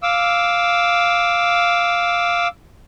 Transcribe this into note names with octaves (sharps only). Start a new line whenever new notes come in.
F5 D6 E6